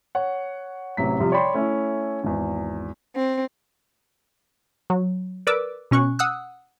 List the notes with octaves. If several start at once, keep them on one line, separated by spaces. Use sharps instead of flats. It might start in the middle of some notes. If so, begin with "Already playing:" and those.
C#5 F#5
A1 C3 F#3 B6
C3 F3 G3
C#5 D5 G5 B5 C6
A3 C#4 E4
G#1 E2
C4
F#3
A#4 B4 D5 D6 E6
B2 C#4 C#6 F#6
F#5 D#6 E6 F#6